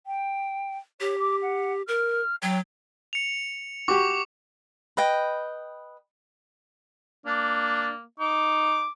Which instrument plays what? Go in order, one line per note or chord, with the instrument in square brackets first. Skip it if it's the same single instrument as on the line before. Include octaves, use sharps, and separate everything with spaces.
[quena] G5
[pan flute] G4 [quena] C#5
[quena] D6
F#5
[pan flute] A#4 [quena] F6
[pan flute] F#3 [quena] G5
[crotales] C#7 F7
[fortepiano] F#4 G4 [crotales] C#6 D6
[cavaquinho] B4 D#5 G5
[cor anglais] A#3 [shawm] D4
[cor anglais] D#4 [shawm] D6